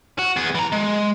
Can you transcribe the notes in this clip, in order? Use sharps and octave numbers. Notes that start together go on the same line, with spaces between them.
F#4
B3 G#4
E3 A#5
G#3